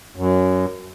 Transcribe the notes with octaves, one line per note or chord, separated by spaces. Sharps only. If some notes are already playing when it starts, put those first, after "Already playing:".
F#2